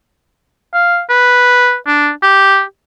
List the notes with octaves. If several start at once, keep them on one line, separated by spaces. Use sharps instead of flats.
F5
B4
D4
G4